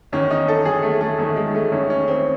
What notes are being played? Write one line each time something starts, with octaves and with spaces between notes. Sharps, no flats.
E2 D#3 C#4
D#4
A4
E2 D#3 G#4
A3
A3
E2 D#3 A3
G#3
A3
E2 D#3 C#4
C#4
C4